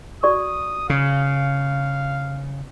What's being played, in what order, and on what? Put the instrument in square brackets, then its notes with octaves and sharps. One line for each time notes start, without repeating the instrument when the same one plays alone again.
[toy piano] F#4 D5 C#6 [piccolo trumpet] D#6
[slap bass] C#3 [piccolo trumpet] F5